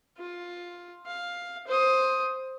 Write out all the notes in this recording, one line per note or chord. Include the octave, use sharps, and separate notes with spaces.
F4
F5
C5 D#6